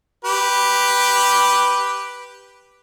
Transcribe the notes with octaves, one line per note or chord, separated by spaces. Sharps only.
G4 B4